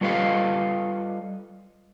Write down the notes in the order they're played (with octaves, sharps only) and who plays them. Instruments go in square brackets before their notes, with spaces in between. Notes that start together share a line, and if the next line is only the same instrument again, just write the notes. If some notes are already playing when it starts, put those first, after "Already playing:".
[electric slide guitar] G3 F4 A4 B4 D#5 F5